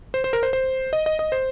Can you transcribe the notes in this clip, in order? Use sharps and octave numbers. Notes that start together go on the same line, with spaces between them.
C5
C5
A#4
C5
C5
D#5
D#5
D#5
C5